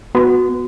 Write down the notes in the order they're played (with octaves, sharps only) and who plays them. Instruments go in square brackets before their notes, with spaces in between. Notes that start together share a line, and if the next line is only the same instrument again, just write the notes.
[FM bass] B3 [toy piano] F#4